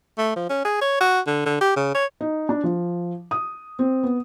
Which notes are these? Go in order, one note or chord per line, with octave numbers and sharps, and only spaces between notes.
A3
F3
C#4
G#4
C#5
F#4
D3
D3
G4
C#3
C#5
D#4
D4
F3
D#6
C4
B3